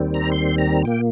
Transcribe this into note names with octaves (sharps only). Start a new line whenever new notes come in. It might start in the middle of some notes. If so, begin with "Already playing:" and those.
Already playing: D#2 D#3 G3 C4
A#5
C6
A#5
A#2 A#3 G5